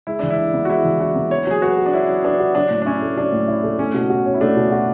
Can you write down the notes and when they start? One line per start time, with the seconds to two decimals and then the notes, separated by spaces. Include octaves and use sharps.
0.07 G#3 E4
0.19 E3 D4
0.30 E4
0.38 D4
0.54 B3
0.65 F#4
0.69 G#3 E4
0.85 E3
1.00 D4 F#4
1.16 B3
1.31 C#4 C#5
1.47 F#3 G#4
1.62 F#4 B4
1.78 F#4
1.86 D4
1.93 C#4 E4
2.09 F#3
2.24 D4 B4
2.40 F#4
2.55 F#3 D4
2.71 A2
2.82 D4
2.86 C#4 E4
3.02 A3
3.17 F#3 D4
3.33 A2
3.48 E4
3.63 A3
3.79 A3 C#4
3.94 B2
4.10 F#4
4.26 C#4
4.34 E4
4.41 A3 D4
4.57 B2
4.72 F#4